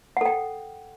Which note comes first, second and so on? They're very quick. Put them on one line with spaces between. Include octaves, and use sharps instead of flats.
F#5 A4 G5